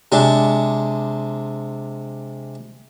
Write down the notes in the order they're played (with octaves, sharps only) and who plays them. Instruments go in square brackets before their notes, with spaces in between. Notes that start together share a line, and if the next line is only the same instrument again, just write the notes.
[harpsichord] C3 G#3 D4